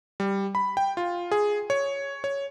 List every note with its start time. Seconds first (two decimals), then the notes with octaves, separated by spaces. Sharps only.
0.20 G3
0.55 B5
0.77 G5
0.97 F4
1.32 G#4
1.70 C#5
2.24 C#5